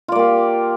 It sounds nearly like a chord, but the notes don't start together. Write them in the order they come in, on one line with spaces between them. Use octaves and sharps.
F4 D5 A#3 G4